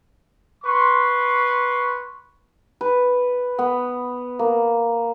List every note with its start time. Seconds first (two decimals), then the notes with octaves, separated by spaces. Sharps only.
0.64 B4 C6 C#6
2.81 B4
3.59 B3
4.39 A#3